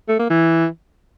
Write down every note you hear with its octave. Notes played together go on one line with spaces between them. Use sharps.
A3
A#3
E3